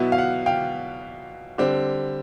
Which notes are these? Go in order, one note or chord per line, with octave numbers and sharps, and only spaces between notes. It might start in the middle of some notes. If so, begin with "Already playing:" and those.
Already playing: B2 F#3 B3 E4
F5
F#5
F5 G5
D3 G3 C4